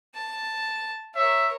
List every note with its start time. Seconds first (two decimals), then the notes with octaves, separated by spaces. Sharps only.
0.15 A5
1.15 A#4 C#5 E5